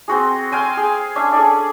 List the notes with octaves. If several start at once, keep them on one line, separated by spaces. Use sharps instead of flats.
C4 F#4 G#4
F5 G5 G#5 C6
G#4
C#4 D4 E5
G#4 A4 D5